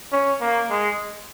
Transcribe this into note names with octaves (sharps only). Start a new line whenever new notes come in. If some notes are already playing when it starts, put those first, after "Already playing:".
C#4
A#3
G#3